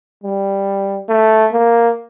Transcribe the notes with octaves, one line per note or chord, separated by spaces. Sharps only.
G3
A3
A#3